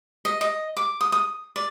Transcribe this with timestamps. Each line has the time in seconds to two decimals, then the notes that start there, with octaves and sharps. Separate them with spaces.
0.25 D#5
0.41 D#5
0.77 D6
1.01 D#6
1.12 D#6
1.56 D5